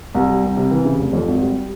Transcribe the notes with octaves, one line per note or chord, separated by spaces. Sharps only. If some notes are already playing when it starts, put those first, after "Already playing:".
C2
G3
C2
C3
E3
C#3
F1
F2
G#1
G3